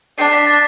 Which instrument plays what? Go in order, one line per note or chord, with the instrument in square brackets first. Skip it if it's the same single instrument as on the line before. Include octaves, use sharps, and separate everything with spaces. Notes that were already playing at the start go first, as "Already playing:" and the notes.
[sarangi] D4 [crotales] C7
[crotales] B6
A6